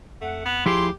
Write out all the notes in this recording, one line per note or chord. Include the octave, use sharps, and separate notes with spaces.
F2 A3 F#5
B3
D2 F3 E4 G4 G#4 C6